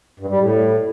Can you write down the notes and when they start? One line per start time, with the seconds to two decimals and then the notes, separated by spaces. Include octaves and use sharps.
0.20 G2
0.30 G3
0.40 A2